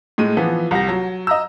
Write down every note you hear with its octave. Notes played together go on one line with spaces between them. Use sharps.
A2 G#3 D#7
E3 F3 B3
C2 G4 A#6
F#3
D#5 A#5 E6